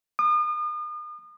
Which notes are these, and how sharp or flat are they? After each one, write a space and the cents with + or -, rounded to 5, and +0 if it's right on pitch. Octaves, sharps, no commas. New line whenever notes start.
D#6 -40